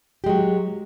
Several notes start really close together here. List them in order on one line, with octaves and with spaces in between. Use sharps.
G4 G#3 F#3